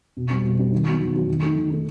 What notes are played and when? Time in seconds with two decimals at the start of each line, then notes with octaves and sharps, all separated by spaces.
0.17 B2
0.30 G3 C4
0.44 B2
0.58 G3 C4
0.72 D#3
0.86 F#3 B3 F#4
1.00 D#3
1.15 F#3 B3 F#4
1.28 D#3
1.42 A3 D#4
1.56 D#3
1.70 A3 D#4